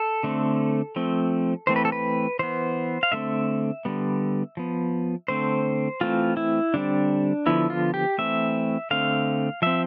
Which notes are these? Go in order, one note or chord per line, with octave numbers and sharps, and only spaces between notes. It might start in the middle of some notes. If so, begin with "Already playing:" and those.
Already playing: A4
D3 A3 C4
F3 A3 C4
E3 A3 C4 C5
B4
A4
B4
E3 B3 C5
F5
D3 A3 C4 E5
D3 G3 B3
F3 B3
D3 A3 C4 C5
E3 A3 C4 F4
E4
D3 G3 C4 D4
D3 F3 B3 E4
F4
G4
E3 A3 C4 E5
D3 A3 C4 F5
F3 C4 E5